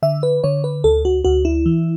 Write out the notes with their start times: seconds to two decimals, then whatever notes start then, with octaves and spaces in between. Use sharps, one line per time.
0.02 D3 E5
0.23 B4
0.44 D3 C#5
0.64 B4
0.84 D2 A4
1.05 F#4
1.24 D2 F#4
1.45 E4
1.66 E3